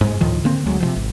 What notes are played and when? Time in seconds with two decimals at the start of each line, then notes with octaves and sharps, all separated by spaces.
0.01 G#2 G#3
0.21 D2 A2 D#3 F3
0.44 D3 A#3 C4
0.66 D2 F#3 G#3
0.80 C3 D#3 F3
0.96 G#1